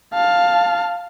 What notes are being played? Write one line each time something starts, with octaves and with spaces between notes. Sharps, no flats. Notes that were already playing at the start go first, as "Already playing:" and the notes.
F5 A5